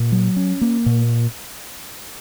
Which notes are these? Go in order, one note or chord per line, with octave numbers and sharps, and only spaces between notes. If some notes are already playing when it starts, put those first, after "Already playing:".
Already playing: A#2
F#3
C#4
A#3
A#2